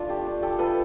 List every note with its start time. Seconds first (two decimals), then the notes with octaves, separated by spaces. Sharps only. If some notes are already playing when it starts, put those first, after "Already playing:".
Already playing: A3 D4 F4
0.09 G4 A4
0.26 D4
0.42 G4 A4
0.59 F4 A4 B4